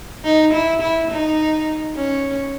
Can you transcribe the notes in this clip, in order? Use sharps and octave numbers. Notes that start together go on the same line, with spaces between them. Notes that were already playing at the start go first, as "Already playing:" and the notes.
D#4
E4
E4
D#4
C#4